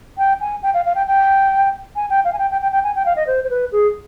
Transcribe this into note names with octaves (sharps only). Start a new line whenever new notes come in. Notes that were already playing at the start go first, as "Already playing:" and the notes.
G5
G#5
G5
F5
F5
G5
G5
G#5
G5
F5
G#5
G5
G5
G5
G5
G#5
G5
F5
D#5
C5
C5
B4
G#4